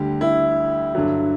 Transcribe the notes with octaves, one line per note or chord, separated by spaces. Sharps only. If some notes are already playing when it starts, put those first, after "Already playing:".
Already playing: D2 D3 G3 G4
E4
G2 D3 F#3